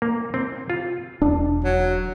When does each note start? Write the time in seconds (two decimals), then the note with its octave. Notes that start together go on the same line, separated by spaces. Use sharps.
0.02 A#3
0.34 C4
0.70 F4
1.22 E1 D4
1.64 F#3